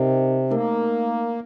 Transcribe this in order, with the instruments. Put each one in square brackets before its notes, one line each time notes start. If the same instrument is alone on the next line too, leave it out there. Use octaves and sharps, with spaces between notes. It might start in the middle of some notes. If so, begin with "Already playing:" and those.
Already playing: [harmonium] C3 [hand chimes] D#4 A#4 D#5 G5
[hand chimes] A3 D#4 A#4 [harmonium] A#3